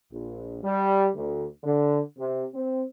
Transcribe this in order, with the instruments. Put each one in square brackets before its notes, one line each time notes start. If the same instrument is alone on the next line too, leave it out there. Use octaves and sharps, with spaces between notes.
[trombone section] A#1
G3
D2
D3
C3
C4